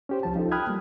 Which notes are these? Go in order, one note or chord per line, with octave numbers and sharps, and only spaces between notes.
C#4 G4 C5
C2 F3 A5
F3 D#4 A4
G5 B5 D#6 F6 F#6 G#6
G3 A#3